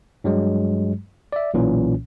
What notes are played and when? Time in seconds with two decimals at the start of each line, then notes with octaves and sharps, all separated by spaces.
0.24 G2 F#3 G#3
1.32 D5 E5
1.54 B1 A#2 E3 C#4